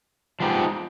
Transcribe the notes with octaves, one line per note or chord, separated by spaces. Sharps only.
F3 G#3 B3 D#4 G4